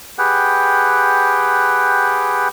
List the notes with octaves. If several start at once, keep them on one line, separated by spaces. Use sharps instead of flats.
G4 G#4 B4 F#5 G5